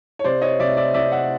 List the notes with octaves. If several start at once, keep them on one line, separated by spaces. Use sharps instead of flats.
C#5
C3 C5 D5
C#5 D#5
C3 D5 E5
D5 E5
C3 D5 E5
E5 F#5